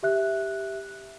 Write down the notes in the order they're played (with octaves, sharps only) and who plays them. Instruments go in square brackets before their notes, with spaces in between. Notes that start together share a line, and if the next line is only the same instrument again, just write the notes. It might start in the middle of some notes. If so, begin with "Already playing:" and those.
[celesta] G4 E5 F#6